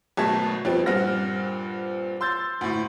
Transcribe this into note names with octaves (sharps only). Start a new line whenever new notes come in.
G#1 B2 F#3 A3 A5 G#6
F2 F3 G3 B3 C4
G2 A#2 C4 F#5 F6 A#6
C6 E6 G6 A6
D2 A2